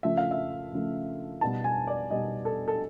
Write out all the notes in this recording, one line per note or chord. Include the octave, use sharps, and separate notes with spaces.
C#3 F3 A3 E5
F5
E5
C#3 F3 A3
B2 G3 B3 D#4 A5
G#5
D5
B2 G3 B3 D#4 D#5
A4
A4